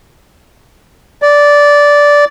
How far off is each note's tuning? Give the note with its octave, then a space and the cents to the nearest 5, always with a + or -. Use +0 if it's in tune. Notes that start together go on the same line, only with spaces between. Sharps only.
D5 -10